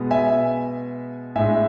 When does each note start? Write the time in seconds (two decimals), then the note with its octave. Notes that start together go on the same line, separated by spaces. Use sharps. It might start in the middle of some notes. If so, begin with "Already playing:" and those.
Already playing: B2 G#3 B3
0.11 E5 G#5
1.36 A2 G#3 D4 E5 G#5